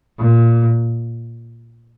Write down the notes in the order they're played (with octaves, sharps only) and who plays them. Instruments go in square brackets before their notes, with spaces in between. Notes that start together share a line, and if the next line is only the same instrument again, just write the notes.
[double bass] A#2